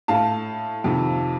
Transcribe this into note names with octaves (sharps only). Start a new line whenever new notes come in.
A2 F5 A5
F2 C3 D#3